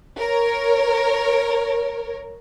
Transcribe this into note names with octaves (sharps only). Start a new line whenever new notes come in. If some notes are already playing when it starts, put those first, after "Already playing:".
A#4 C#5